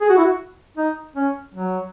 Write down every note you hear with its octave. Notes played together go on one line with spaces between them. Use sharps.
G#4
F#4
E4
F#4
D#4
C#4
F#3